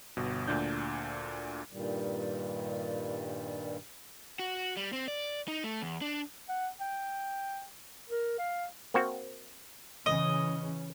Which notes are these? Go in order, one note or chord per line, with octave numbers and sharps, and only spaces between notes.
G1 B2
D2 A#2 D4 G6
G2 A#2 D#3 G3
F#4
G3
C4
D5
D#4
A3
E2
D4
F#5
G5
A#4
F5
A#3 C4 F#4
C#3 E3 C#4 D#5